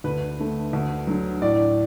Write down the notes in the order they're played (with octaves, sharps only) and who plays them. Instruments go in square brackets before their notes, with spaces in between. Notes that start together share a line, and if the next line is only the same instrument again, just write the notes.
[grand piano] D2 B4
D3 A3
D2
D3 F#3
A2 D5